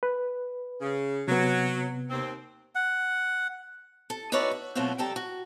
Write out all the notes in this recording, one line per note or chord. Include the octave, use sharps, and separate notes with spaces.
B4
C#3
C3 F#3 B3
D#2 C4
F#5
A4
D#4 F#4 B4 C#5 D5 E5
F#4
B2 F#3 A3 C4 F4 F#4
F2 G3 A4 G5 A5 A#5
F#4